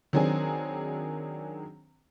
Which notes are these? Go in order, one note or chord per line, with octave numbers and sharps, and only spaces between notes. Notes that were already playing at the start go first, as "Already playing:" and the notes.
D#3 F#3 C4 D4 G#4